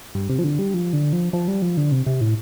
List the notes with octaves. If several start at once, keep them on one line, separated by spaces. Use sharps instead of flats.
G2
C3
F3
D3
G3
F3
D3
F3
F3
G3
F3
D3
C3
C3
A2